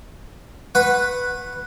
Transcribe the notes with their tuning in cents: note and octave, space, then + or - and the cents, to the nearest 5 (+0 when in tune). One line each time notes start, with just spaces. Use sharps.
B4 +0 F#5 +0 C#6 -30